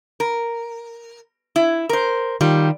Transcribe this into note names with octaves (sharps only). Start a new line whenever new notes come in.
A#4
E4
A#4 C5
D#3 G3 F4